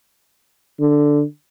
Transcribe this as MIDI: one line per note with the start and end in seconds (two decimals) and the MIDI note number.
0.80 1.23 50